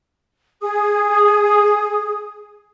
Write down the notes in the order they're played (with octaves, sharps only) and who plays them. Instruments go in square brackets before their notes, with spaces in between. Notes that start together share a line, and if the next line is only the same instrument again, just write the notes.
[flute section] G#4 D#6